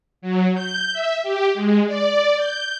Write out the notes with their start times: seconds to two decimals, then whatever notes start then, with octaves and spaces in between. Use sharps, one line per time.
0.22 F#3
0.54 G6
0.93 E5
1.23 G4
1.54 G#3
1.86 D5
2.36 G6